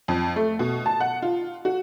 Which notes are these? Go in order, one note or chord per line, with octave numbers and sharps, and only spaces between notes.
F2
A3
B2
A5
F#5
F4
F#4